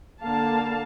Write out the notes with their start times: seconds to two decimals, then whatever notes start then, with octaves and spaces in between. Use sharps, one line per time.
0.21 D3 A#3 F5 A5